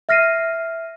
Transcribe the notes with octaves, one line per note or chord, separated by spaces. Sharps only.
E5 F6 A#6 C7 D#7